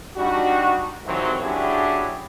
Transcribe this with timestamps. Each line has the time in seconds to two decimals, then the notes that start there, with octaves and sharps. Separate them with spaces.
0.17 G3 D4 D#4 F#4
1.06 C2 G#2 D#3 E3 F#3 C4
1.42 F#3 C#4 D4 E4 G4 G#4